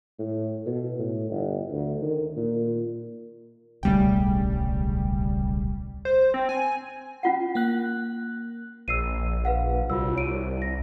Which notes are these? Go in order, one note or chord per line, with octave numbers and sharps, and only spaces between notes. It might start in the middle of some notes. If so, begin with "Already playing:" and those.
A2
B2
A2
G1
D2
D#3
A#2
D1 B1 C#3 G3 A3 G5
C5
C4
G#5
C#4 F4 F#5
A#3 F#6
A#1 E6 C7 D#7
B4 F5 F#5
C2 F4 F#4 E6
C#5 D7 D#7
E4 A#6